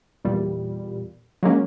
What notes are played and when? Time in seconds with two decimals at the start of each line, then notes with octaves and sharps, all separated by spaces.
0.25 E2 A#2 G3
1.43 F#3 G#3 A#3 C#4